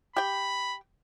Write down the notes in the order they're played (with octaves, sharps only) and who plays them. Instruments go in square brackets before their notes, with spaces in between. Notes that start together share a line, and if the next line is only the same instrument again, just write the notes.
[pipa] G4 G5 [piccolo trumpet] B5